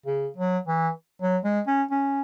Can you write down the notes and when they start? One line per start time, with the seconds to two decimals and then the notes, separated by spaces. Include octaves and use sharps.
0.06 C#3
0.37 F#3
0.67 E3
1.22 F#3
1.44 G#3
1.67 C#4
1.91 C#4